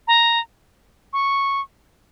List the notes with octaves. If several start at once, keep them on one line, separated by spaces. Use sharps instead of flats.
A#5
C#6